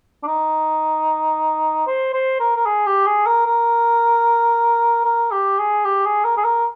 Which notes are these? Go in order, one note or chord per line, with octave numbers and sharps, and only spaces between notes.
D4
D#4
C5
C5
A#4
A#4
G#4
G4
G#4
A#4
A#4
A#4
G4
G#4
G4
G#4
A#4
G#4
A#4